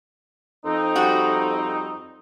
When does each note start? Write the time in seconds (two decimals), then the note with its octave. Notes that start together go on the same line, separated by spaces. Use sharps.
0.65 F2 C4 D#4
0.96 G3 F#4